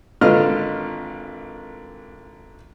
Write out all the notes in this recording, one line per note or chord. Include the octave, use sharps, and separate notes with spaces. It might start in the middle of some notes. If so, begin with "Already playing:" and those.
G#1 D3 F4 B4 D#5 F6